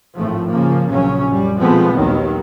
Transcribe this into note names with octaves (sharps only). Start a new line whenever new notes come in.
G#1 A2 F3 A3
C#3 F3 A#3
A#1 C#3 F#3 C#4
F#2 G3
B2 F3 G#3 A3 B3 C4
A#1 D#2 D#3 F#3